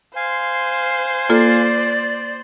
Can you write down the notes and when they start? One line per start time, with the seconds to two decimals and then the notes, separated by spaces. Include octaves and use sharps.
0.16 C5 F5 G#5
1.29 A#3 F4 A4 D5